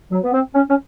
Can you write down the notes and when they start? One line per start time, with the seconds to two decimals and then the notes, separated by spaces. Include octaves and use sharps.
0.11 F#3
0.24 B3
0.33 C4
0.54 C#4
0.69 C#4